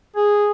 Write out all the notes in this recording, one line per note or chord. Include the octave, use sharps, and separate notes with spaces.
G#4